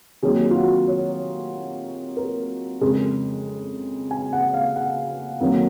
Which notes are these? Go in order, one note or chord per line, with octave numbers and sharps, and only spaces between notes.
C3 D#3 F#3 A#3 G#4
F4
F#4
C#5
A#4
F2 C#3 G#3 A#4
G#5
F#5
F5
F#5
F2 D#3 F#3 A#3